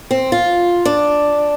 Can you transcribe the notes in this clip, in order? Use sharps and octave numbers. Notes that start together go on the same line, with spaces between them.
C4
F4
D4